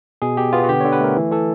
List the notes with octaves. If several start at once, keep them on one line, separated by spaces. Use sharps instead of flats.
B2 G#4
B2 G4
B3 F4
F#4
D3 G4
D3 C#5
B4
A3 A#4
E3
E3 A4